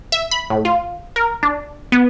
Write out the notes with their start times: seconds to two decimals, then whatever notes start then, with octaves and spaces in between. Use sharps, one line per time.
0.12 E5
0.31 B5
0.50 A2
0.65 F4
1.16 A#4
1.43 D4
1.92 B3